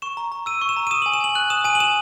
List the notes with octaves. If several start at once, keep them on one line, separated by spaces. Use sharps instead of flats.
C#6 E7
A#5
A#5
E6 D#7
C#6
E7
A#5
D#7
D#6 E7
G#5 F#7
E7
G#5 F#7
F#6 F#7
D#6 E7
G#5 D#7
F#7
D#6 E7